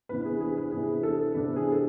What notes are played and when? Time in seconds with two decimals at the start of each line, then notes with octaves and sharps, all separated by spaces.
0.09 C3 E3 B3 D4 B4
0.25 G#4
0.40 G#4
0.57 B4
0.72 C3 E3 B3 D4 G#4
1.03 A4
1.34 C3 E3 B3 D4 B4
1.56 G#4
1.72 A4